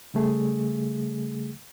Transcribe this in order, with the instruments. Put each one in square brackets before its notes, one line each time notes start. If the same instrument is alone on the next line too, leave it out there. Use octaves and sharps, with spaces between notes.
[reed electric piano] C#3 G3 A3 G#4